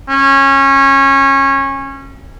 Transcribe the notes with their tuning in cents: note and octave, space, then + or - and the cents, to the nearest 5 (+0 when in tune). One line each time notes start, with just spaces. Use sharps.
C#4 -20